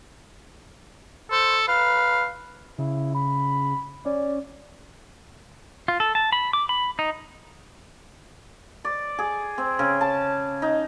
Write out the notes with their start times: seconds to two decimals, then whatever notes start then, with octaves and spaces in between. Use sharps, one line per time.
1.31 A4 C5
1.68 B4 F5
2.79 C#3 E4
3.15 B5
4.06 C#4 D5
5.88 F4
6.00 A4
6.15 A5
6.33 B5
6.53 D6
6.69 B5
6.99 D#4
8.85 D5
9.19 G#4
9.58 C4
9.79 C#3
10.01 A5
10.62 D#4